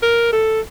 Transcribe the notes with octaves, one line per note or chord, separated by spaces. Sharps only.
A#4
A4